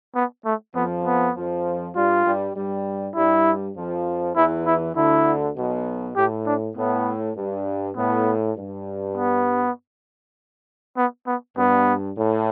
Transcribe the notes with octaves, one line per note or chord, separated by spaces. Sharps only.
B3
A3
F2 F3 B3
B3
F2 F3
G2 G3 F4
G2 G3
G2 G3
G2 G3 E4
F2 F3
E2 E3 E4
E4
D2 D3 E4
B1 B2
A2 G4
D4
A2 B3
G2
A2 B3
G2
B3
B3
B3
G2 B3
A2